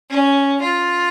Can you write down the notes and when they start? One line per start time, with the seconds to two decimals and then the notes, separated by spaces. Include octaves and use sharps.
0.10 C#4
0.62 F4